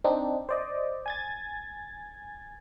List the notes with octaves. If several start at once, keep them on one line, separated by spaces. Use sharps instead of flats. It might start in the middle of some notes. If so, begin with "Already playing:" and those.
C4 D4 D#4
C5 D5 D#5
G#5 G#6 A6